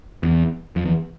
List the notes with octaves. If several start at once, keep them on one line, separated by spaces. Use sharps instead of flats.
E2
F2
E2